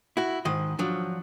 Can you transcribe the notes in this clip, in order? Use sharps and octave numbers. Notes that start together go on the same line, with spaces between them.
E4 F#4
G#2 D#3 D#5
F3 F#3 D4